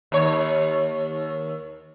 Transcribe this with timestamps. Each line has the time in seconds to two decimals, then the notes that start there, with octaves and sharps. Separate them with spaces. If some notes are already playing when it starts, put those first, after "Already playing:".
0.12 D#2 C#5